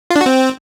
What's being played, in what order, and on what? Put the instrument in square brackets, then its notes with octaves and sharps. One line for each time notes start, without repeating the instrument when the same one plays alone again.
[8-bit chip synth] F4
D4
F#4
C4